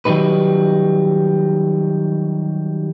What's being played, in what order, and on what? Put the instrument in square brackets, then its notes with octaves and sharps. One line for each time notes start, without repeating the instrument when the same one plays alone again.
[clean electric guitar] D#3 F#3 G3 D#4 B4